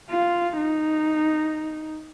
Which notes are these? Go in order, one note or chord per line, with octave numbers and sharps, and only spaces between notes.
F4
D#4